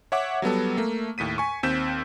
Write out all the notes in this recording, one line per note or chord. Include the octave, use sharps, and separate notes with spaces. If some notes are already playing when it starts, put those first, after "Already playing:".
C#5 E5 F#5 D6
F#3 G3 B3 A4
A3 A#3
D#2 A2 B6 D#7
G#5 C#6
D#2 C4 E6 G6 B6 E7